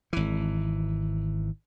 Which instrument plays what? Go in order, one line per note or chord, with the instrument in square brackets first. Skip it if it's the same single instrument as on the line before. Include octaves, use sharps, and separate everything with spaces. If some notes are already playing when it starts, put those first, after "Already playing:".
[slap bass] G#1 E3